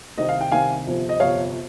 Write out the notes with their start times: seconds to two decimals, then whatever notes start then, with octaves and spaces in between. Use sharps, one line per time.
0.18 C2 C3 D#3 D#5
0.29 F5
0.41 G5
0.52 C2 C3 D#3 F5 G#5
0.86 G1 F2 C3 F3
1.09 D#5
1.20 G1 F2 C3 F3 C#5 F5